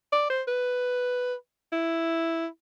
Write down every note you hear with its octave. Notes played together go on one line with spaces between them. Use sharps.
D5
C5
B4
E4